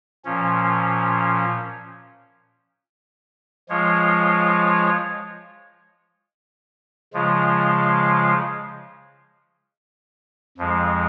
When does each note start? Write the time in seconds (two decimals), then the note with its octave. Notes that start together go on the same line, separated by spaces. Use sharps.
0.25 A#2 F3 C#4
3.69 F3 G#3 F4 C#5
7.14 C#3 F3 G#3 F4
10.58 F2 F3 G#3